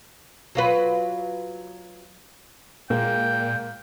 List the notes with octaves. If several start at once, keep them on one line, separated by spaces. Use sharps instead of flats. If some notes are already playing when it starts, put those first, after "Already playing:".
F#3 F4 B4
A#2 G#3 A#3 G5